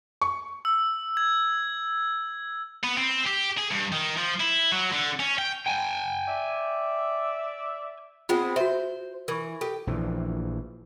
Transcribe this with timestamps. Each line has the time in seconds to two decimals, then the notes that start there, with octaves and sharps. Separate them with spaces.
0.21 C#6
0.65 E6
1.17 G#6
2.84 B3
2.97 C4
3.26 G4
3.58 G#4
3.71 G2
3.92 D#3
4.18 F3
4.40 E4
4.72 F#3
4.92 D3
5.20 C#4
5.38 G5
5.67 G5 G#5
6.28 D5 E5
8.29 G#3 B3 C4 F4
8.56 F#4 C5 E5
9.28 E3 A#4 C#6
9.61 G4 A4
9.87 A#1 E3 F3